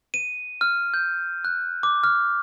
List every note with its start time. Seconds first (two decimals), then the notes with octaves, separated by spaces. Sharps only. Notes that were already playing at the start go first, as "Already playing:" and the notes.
0.14 D#7
0.61 F6
0.94 G6
1.45 F#6
1.83 D6
2.04 F6